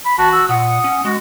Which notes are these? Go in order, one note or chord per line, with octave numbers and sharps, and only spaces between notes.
B5
A1 F#4 A5
E6
A#2 F#5 D#6
C#4
G#3 F#4